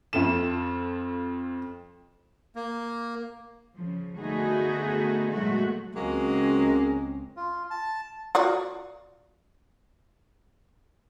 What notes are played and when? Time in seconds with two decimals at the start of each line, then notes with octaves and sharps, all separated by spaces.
0.13 F2 F4 A4 E7
2.55 A#3
3.75 C#3 F3
4.19 D3 A3 B3 D#4 F#4 G#4
5.31 A#2 F#3 G#3 A3 F#4
5.94 C#2 F#3 G#3 A#3 C4 C#4
7.36 F4
7.70 A5
8.35 F4 F#4 D5